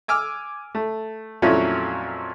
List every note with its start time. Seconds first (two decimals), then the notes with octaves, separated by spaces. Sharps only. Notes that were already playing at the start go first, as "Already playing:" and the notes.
0.08 G#5 D6 E6 F6
0.75 A3
1.42 F2 A#2 F#3 A3 C#4 E4